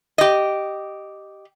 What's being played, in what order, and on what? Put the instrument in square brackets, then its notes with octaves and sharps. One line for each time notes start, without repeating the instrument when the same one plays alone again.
[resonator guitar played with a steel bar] G4 D#5